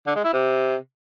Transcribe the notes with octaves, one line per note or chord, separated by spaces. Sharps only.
D3
G#3
E4
C3